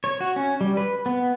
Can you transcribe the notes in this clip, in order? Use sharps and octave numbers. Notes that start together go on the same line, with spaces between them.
C#5
F#4
C#4
G3
B4
B3